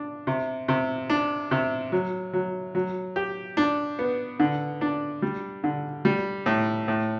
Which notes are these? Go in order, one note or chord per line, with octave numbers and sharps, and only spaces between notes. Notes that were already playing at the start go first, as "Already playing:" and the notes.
Already playing: D4
C3
C3
D4
C3
F#3
F#3
F#3
G4
D4
B3
D3
D4
G3
D3
G3
A2
A2